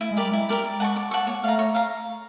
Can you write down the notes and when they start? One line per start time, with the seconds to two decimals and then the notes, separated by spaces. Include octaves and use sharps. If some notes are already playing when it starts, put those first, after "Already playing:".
0.01 A3 E4
0.11 G#3
0.17 G4 A#4 D5
0.22 G3
0.32 G#3 E4
0.49 G4 A#4 D5
0.65 D5
0.80 G#3 F#5 A5
0.84 C#6
0.96 D5
1.11 F#5 A5 C#6
1.27 A#3 C#5
1.43 A3 F5 A#5
1.59 C#5
1.75 F5 A#5